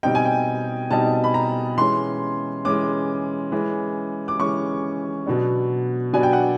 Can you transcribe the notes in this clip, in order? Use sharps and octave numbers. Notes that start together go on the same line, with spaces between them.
B2 G3 C4 D#4 G5
G#5
G5
B2 G3 C4 D#4 A5
B5
A#5
E3 G#3 C#4 C6
E3 G#3 C#4 D6
E3 G#3 C#4
D6
E3 G#3 C#4 C#6
B2 F#3 B3 D4
B2 F#3 B3 D4 G#5
G5
F#5